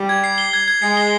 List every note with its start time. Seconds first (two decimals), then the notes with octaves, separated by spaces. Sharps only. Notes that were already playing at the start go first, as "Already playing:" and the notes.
Already playing: G3
0.09 G#6
0.24 C7
0.38 G7
0.53 G#6
0.68 G#6
0.82 G#3 C7
0.97 G7